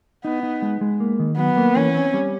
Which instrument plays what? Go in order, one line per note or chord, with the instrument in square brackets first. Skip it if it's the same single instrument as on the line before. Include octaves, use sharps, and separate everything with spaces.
[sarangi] B3 [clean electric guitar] D#4
[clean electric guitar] D#4
G#3
G#3
A#3
D#3
[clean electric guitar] F#3 [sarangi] B3
[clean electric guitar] A#3
[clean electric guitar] E3 [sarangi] C#4
[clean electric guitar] C4
G3